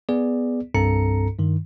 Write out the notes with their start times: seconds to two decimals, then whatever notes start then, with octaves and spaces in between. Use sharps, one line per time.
0.09 B3 G#4 D5
0.74 C2 G2 C4 A4 A#5 C#7
1.39 G2 D#3